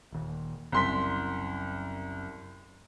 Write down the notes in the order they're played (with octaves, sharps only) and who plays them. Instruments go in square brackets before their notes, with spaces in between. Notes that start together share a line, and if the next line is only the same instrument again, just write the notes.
[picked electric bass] D#1 D#2
[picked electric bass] F#1 F#2 [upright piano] C2 C6 B6